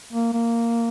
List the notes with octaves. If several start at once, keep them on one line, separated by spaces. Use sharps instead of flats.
A#3
A#3